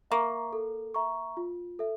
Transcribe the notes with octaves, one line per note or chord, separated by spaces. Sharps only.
A#3 E5 A#5 C#6
A4
E5 A#5 C#6
F4
A4 E5